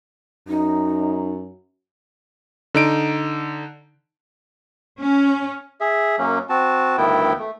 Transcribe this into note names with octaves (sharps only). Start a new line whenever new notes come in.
F#2 D#4
D3 D#4 D7
C#4
G#4 E5
F#2 F#3 A#3 C#4
C4 F#4 A5
D2 G2 D#3 B3 E4 G5
A3